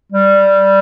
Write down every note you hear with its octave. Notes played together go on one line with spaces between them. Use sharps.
G3